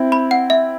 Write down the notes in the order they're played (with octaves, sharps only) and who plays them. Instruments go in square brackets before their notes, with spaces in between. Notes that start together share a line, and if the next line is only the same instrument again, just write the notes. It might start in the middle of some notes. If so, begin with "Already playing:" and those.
Already playing: [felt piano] C4 E4
[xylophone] B5
F#5
E5